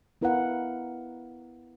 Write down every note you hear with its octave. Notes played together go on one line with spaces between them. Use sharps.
B3 E4 A#4 B4 F5 F#5